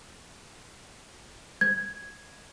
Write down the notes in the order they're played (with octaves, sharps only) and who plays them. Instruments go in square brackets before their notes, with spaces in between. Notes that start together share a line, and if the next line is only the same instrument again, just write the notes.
[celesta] G#6